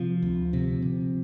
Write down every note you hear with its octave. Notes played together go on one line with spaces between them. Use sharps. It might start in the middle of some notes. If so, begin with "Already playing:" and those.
Already playing: C3 F3
D2
C3
C3